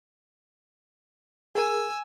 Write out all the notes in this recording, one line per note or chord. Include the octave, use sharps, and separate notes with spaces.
G#4 A#4 G#5 E6